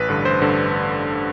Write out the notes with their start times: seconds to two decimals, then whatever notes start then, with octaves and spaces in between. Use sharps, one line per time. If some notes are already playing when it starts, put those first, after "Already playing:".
Already playing: A1 B4
0.09 G2 D3
0.25 A1 C5
0.42 G2 D3